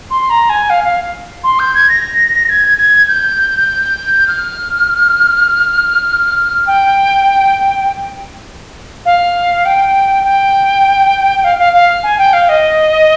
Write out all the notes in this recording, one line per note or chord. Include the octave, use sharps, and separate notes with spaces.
C6
A#5
G#5
F5
F5
C6
G6
G#6
A#6
G#6
G#6
G6
F6
G5
F5
G5
G5
F5
F5
F5
G#5
G5
F5
D#5